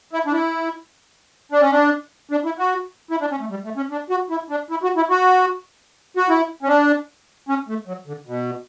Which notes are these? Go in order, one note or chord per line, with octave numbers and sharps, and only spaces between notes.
E4
D4
E4
D4
C#4
D4
D4
E4
F#4
E4
D4
C#4
A3
G3
A3
C#4
D4
F#4
E4
D4
E4
F#4
E4
F#4
F#4
E4
C#4
D4
C#4
A3
F#3
D3
B2